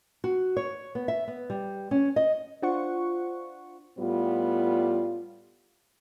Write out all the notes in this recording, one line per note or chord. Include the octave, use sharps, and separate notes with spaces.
F#4
C#5
B3
E5
B3
G3
C#4
D#5
D4 F4 C5 F#5 C#6
A2 G3 B3 F4